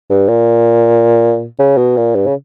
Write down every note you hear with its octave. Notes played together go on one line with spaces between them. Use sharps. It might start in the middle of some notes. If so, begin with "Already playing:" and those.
G2
A#2
C#3
B2
A#2
G2
C#3